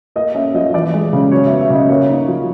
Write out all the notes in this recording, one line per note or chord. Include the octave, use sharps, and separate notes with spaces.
A#3 D#5
C#4 E5
F3 D#5
E3 D5
G#3
C#3
F#3 C#5
B3 E5
E5
C#3 D#5
A#3 C#5
D#4
F3